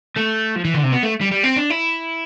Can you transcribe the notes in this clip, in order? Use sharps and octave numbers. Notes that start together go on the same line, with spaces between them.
A3
F3
E3
D3
C3
B3
A3
G3
G3
C4
D4
E4